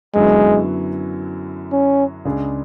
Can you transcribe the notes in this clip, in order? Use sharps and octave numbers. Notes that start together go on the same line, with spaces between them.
F#2 D3 F#3 G#3 B3 E4
C#4
C#2 C#3 G#3 D4 G#4